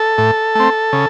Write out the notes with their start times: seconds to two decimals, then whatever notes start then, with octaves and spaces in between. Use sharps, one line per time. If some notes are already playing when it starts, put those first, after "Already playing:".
Already playing: A4
0.18 A2
0.55 A3 C4
0.93 C#3